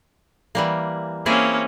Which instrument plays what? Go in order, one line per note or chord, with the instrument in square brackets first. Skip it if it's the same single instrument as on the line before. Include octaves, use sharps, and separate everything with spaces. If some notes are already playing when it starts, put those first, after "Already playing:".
[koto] E3 G3 A#3
[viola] A#3 C#4 [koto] C4 E4 G#4